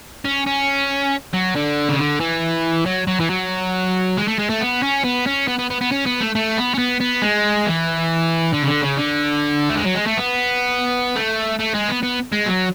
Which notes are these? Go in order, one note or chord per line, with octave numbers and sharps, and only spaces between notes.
C#4
C#4
F#3
D3
C#3
D3
E3
F#3
F#3
E3
F#3
G#3
A3
G#3
A3
B3
C#4
B3
C#4
B3
B3
B3
B3
C#4
B3
A3
A3
B3
C#4
B3
B3
G#3
E3
D3
C#3
D3
C#3
D3
A3
G#3
F#3
G#3
A3
B3
A3
A3
G#3
B3
B3
G#3
F#3